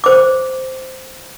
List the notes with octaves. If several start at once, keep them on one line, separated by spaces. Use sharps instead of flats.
C5 D6